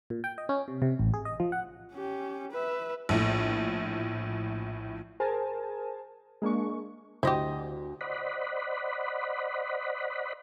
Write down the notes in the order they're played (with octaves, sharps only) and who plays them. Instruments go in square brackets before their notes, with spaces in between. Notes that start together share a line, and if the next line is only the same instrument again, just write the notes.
[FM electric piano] A#2
G5
D#5
C#4
C3
C3
A1
G#4
D#5
F3
F#5
[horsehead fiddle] C#4 G4
B4 E5
[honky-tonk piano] A#1 A2
[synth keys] G#4 A#4 C5 G#5 A5
G#3 A#3 D4 C#6
[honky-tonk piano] D2 [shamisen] E4 G4 [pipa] C5 D#5
[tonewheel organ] C5 D5 D#5 F#5 B5